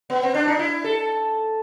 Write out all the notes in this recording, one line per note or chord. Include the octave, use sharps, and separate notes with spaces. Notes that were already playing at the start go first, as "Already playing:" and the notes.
B3
C4
D4
D#4
E4
A4